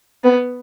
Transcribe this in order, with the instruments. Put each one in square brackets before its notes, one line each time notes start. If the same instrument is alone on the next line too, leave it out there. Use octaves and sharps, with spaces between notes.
[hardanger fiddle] B3